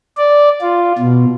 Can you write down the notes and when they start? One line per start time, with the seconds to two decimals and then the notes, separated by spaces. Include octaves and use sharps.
0.18 D5
0.61 F4
0.99 B2